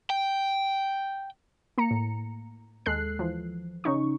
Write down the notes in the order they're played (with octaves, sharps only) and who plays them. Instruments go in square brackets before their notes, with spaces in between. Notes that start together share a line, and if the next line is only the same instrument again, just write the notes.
[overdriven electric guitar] G5
[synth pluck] A#3 A#5 C#7
A2
D#2 G#3 A4 F#6 C7
E3 F3
C#3 C#4 D#4 C#6